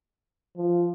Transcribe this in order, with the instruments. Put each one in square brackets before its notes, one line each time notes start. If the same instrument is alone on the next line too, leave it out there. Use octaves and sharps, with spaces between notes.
[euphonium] F3